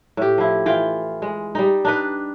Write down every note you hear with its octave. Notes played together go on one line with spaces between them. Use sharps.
A2 G4
F3 E4
E3 F4 G5
G#3
G3 D#4
D4 D#4 B4